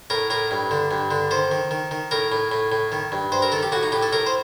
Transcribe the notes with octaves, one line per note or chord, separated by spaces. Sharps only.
A2 A#4
A2 A#4
G2
D3
G2
D3
D#3 C5
D#3
D#3
D#3
A2 A#4
A2
A2
A2
D#3
G2
G2 C5
A#4
D#3 A4
G4
A2 F#4
D#4
A2 G4
A4
A2 A#4
C5